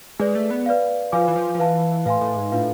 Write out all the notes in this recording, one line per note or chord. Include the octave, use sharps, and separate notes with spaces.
G#3 G#4 B4 D5
A3
B3
B4 D5 F5
F3 F4 B4 F5 G#5 D6
E3
F3
F3
E3 B4 F5 A5
A2 B4 F5 G#5 C6
A2
G#2
A2 D4 F4 B4 F5